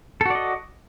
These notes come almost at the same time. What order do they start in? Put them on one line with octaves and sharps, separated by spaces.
A4 F#4 D5 D#5